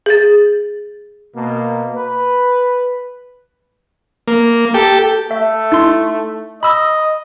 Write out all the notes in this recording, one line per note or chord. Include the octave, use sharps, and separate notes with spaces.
G#4 A6
B2 A#3
B4
A#3
G4 A4
A3 E5
D#4 E4 C6
D#5 B5 E6